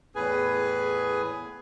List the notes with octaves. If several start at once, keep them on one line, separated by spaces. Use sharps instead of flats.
E2 A2 G#4 B4 G#5